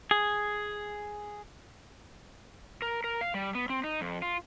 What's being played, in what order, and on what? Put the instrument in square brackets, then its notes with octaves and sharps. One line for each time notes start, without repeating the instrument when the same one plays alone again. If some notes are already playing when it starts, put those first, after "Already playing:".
[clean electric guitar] G#4
[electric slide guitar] A#4
A#4
F5
G3
B3
C4
D#4
F2
F4